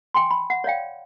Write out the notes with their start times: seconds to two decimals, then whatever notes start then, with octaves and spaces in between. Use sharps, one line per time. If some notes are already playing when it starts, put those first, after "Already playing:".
0.14 G5 G#5 C6
0.31 B5
0.50 F#5
0.64 C#5 D5 F5 G5